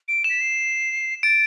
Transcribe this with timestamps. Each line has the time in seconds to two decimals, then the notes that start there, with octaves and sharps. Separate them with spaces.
0.08 D7
0.24 E7
0.30 B6
0.40 C7
1.23 A6 D7